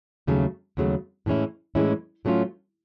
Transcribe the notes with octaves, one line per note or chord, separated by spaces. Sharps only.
D#2 C#3 F#3 A3
D#2 C#3 F#3 A3
A2 E3 G#3 C#4 E4
A2 E3 G#3 C#4 E4
A2 F#3 A3 C#4 F4